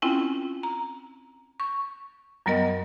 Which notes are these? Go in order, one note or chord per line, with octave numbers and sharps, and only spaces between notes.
C4 C#4 E4 F4 G5 G#5
A#5
C#6
F#2 F#3 G3 B3 A#4 D#5